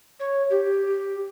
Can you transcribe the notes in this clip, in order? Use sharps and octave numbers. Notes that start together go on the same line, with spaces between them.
C#5
G4